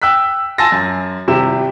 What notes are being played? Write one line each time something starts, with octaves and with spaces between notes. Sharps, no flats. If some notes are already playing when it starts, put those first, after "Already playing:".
G5 E6 F#6 B6
G#5 A5 C6 E6 A6 A#6
F#2
G#1 C3 G3 E4 G4 E7